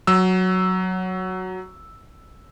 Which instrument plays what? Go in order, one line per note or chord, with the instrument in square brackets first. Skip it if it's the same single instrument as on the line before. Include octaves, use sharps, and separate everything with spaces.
[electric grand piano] F#3 E6